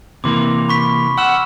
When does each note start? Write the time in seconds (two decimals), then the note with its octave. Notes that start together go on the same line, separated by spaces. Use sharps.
0.24 C3 E3 A#3 C6 D6
0.69 B5 C#6 B6
1.18 F#5 E6 F6 E7